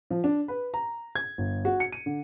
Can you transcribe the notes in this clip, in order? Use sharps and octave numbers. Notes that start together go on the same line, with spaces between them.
F3
D4
B4
A#5
G#6
G1
F#4
C#7
D#7
D3